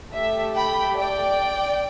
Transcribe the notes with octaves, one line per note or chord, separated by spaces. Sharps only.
A3 G4 E5
G5 B5
D5 G5